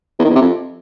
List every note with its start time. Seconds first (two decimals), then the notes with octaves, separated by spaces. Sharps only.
0.19 E2
0.24 D#3
0.30 E2
0.35 C3
0.41 F2